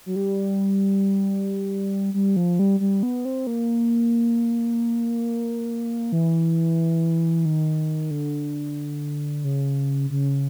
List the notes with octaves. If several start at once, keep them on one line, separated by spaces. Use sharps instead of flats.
F#3
G3
G3
F3
G3
G3
B3
C4
A#3
E3
D#3
D3
C#3
C#3